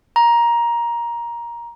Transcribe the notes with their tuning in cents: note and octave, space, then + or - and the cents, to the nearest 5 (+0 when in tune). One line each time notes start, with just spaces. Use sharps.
A#5 +15